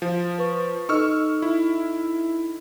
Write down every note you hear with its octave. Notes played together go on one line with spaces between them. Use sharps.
F3
B4 C#6
D#4 A4 D#5 C#6 E6 F6
E4